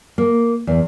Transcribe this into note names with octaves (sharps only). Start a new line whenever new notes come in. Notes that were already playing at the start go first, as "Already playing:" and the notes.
A#3
E2